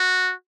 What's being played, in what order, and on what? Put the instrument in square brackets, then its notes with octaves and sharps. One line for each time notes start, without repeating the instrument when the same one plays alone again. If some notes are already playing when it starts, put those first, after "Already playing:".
Already playing: [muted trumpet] F#4